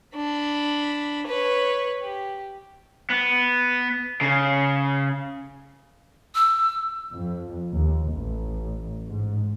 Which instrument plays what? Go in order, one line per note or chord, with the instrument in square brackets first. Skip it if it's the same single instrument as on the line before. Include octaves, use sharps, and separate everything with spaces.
[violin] D4 B5
B4 C#5
G4
[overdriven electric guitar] B3
C#3
[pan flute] E6
[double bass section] F2
D#2
A1
G#2